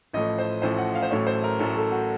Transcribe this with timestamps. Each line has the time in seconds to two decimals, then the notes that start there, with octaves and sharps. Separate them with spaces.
0.13 A1 A2 F3 A3 D#5
0.39 C5
0.62 A1 A2 F3 A3 C5
0.78 F#5
0.95 F5
1.02 C5
1.10 A1 A2 F#3 A3 C#5
1.27 C5
1.44 A#4
1.59 A1 A2 F#3 A3 A4
1.75 A4
1.92 F#4